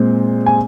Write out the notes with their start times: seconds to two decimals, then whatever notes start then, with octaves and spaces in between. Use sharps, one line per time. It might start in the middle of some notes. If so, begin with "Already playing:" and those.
Already playing: A#2 G#3 C4
0.46 G#5